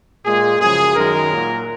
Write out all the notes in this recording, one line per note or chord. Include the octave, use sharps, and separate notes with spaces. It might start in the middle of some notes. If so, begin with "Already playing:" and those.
A#2 G#3 G#4
F#2 C#3 F3 G#4
F#2 D#3 G#3 A#4
A#2 F#3